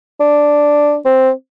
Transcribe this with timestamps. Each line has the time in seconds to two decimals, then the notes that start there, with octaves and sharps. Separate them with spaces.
0.20 D4
1.05 C4